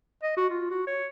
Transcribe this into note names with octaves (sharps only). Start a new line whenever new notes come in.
D#5
F#4
F4
F#4
C#5